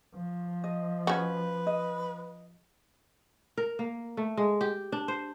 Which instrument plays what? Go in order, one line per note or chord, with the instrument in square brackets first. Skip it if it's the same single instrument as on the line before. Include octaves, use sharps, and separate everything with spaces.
[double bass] F3
[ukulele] D#5
[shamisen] C#4 F#4 [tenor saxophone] B4
[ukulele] D#5
[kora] A#4
A#3
A3
G#3
G4
D4
C5